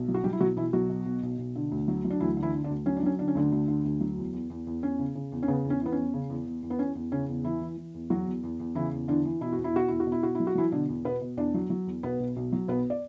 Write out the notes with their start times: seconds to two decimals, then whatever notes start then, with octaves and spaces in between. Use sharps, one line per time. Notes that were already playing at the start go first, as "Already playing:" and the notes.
Already playing: B1
0.08 F#3
0.14 F#4
0.24 F#3 G3 G4
0.33 E4
0.40 B1 F#3 F#4
0.57 B2 E3 E4
0.73 B1 F#3 F#4
0.89 B2
1.06 B1
1.23 B1
1.38 B1
1.56 D3
1.72 D2
1.88 F#3
2.05 F#3
2.10 D4
2.20 D2 E3 E4
2.37 D3
2.43 E3 E4
2.54 D3
2.64 D3 D4
2.70 D2
2.86 F#3 C#4
2.97 D4
3.03 F#3 C#4
3.19 D3 D4
3.28 C#4
3.35 D2 D3 D4
3.52 D2
3.68 D3
3.85 D2
4.00 F#3
4.18 E2
4.33 E2
4.50 E2
4.67 E2
4.83 E2 C#4
4.99 C#3
5.15 C#3
5.32 E2
5.43 C#4
5.48 C#3 B3
5.65 E2
5.70 C#4
5.81 E3 B3
5.92 C#4
5.97 E2
6.14 C#3
6.30 E2
6.46 E2
6.63 E2
6.70 B3
6.79 E2 C#4
6.95 E2
7.12 C#3 C#4
7.28 E2
7.44 E3 E4
7.61 E3
7.77 E3
7.94 E2
8.10 E2 F#3 F#4
8.26 E2
8.43 E2
8.60 E2
8.75 C#3 E3 E4
8.93 E2
9.08 D3 E3 D4
9.25 E3
9.41 B2 E4
9.53 E2 F#4
9.64 E4
9.74 B2 F#4
9.88 E2 E4
10.00 F#4
10.07 B2
10.12 E4
10.23 B2 F#4
10.35 F#3 E4
10.47 F#4
10.55 E3 F#3 E4
10.72 B2 D3 D4
10.89 E2
11.05 B2 B3 B4
11.21 B2
11.37 E2 D4 D5
11.54 F#3
11.70 F#3
11.87 E2
12.03 B1 B3 B4
12.20 B1
12.36 B1
12.52 F#3
12.68 B1 B3 B4
12.90 D5